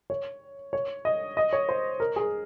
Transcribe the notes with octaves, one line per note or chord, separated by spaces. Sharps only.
C#5
C#5
D#5
D#5
C#5
C5
A#4
G#4